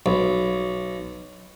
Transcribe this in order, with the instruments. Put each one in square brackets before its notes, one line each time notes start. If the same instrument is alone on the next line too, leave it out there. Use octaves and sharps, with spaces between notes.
[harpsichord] B1